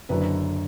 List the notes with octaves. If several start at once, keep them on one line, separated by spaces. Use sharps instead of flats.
F#1 F#2 D3 B4